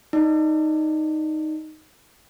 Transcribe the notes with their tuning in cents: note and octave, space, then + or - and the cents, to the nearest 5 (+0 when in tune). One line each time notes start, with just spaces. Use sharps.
D#4 +0 D5 +0